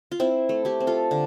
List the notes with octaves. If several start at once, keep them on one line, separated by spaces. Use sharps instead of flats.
F4
C4 E4
A3
E4 G4
C4
F4 A4
D3